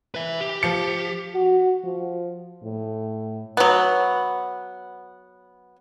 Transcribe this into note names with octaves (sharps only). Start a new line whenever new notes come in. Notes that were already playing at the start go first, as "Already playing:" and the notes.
B4 E5
G4
F3 C#7
F#4
F3
A2
F#3 B3